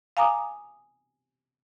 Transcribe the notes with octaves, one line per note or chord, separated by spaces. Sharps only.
F5 G#5 A#5 D6 D#6